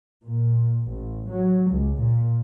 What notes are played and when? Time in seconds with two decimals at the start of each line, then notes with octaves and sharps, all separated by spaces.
0.22 A#2
0.87 A1
1.29 F#3
1.69 C#2
1.99 A#2